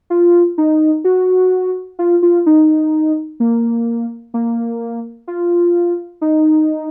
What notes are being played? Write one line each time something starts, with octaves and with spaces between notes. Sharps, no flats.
F4
D#4
F#4
F4
F4
D#4
A#3
A#3
F4
D#4